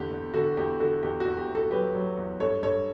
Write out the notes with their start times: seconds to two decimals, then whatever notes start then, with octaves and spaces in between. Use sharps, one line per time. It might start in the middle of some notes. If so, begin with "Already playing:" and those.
Already playing: E2 D3 G4
0.11 E2
0.34 D3 F#4 A4
0.57 E2 G4
0.80 D3 F#4 A4
1.03 E2 G4
1.20 F#4
1.25 E2
1.37 G4
1.48 E2
1.55 F#4 A4
1.71 F#3 G4 B4
1.95 F#3
2.17 E2
2.40 G2 A4 C#5
2.63 G2 A4 C#5